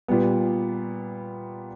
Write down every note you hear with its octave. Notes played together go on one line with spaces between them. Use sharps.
A#2 G3 B3